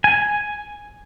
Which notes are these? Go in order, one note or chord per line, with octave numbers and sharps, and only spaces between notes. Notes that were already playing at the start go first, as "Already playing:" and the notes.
G#5